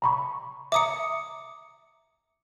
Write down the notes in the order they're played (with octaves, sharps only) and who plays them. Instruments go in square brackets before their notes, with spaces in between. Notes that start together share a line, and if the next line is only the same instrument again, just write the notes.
[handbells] A#5 B5 C#6
[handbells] E5 A#5 [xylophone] D6 D#6 C#7